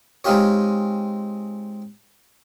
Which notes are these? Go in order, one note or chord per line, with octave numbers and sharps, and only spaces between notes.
G#3 C4 D#4 F4 G4 C#5